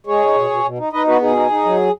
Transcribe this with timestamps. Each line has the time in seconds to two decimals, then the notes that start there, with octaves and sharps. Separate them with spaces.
0.06 G#3 G#4 C#5
0.21 D#4
0.35 B2
0.50 B2
0.64 B2
0.78 D#4
0.92 D#4 B4 D#5
1.07 B3 F#4 B4
1.21 B2 D#4 G#4
1.35 D#4
1.50 D#4
1.65 F#3